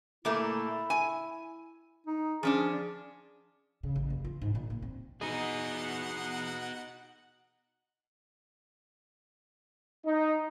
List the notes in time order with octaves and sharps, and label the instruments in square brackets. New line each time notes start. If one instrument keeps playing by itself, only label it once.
[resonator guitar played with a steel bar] A#2 A3 A#3 [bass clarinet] E4
[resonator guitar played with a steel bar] G#5
[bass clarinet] D#4
[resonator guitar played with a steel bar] F3 C#4 D4 [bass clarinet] G#4
[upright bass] C#3
A1
F#1
F4
G#2
A#2
A#3
C4
[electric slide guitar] B3 G#4 [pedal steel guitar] D#4 D#5 [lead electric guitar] F#4 B4 [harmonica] F#5
[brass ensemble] D#4